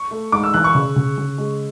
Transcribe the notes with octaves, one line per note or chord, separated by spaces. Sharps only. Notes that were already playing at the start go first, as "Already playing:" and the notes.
Already playing: C#6
A3
G#2 D6
E6
E3 F#6
C#6
C#3
C#3
C#3
G#3